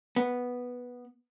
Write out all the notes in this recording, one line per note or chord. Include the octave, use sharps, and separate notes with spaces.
B3